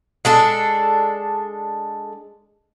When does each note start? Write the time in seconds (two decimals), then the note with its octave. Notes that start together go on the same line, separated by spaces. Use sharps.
0.25 G#3 D4 A4